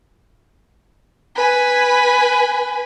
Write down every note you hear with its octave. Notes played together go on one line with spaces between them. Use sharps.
B4 G#5